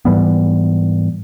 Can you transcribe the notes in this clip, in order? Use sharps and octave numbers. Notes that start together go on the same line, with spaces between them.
G#2 E3 G3 B3